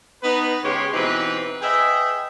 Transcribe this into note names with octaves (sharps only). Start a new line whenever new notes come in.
B3 D#4 B4
G#2 C#3 G#3 G4 C#5 C6
B2 E3 C4 D#4 G4 B4
G#4 B4 D#5 E5 G5